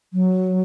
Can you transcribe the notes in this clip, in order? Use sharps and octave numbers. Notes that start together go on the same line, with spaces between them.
F#3